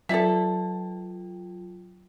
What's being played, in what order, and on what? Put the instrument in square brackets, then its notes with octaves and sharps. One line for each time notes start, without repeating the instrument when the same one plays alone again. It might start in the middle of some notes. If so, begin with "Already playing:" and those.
[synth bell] F#3 F4 G5 [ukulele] A4 D5 E5